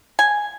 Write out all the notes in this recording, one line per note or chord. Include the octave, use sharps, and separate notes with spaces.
G#5